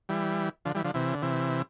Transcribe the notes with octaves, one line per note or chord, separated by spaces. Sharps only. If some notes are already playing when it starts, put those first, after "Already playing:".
E3 G3
D3 F3
E3 G3
D3 F3
C3 E3
D3
C3 E3